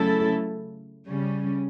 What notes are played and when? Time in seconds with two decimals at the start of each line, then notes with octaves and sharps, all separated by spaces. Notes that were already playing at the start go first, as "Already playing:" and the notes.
Already playing: C#3 F#3 A3 E4 A4
1.07 C#3 G3 C#4